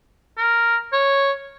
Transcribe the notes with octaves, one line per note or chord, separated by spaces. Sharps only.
A#4
C#5